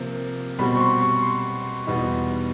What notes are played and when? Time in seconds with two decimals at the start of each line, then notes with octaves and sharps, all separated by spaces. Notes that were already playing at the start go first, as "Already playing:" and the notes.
Already playing: C3 F3 A#3
0.59 B2 G3 C4 B5
0.76 C#6
0.80 C6
1.02 C#6
1.22 C6
1.87 E2 B2 G3 B3 D#4